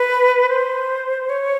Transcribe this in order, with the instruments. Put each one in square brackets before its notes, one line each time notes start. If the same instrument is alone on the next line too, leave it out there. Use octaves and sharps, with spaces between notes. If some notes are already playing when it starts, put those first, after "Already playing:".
Already playing: [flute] B4
C5
C#5